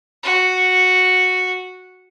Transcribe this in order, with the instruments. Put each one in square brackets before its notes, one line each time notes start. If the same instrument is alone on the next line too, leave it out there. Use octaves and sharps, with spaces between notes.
[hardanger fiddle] F#4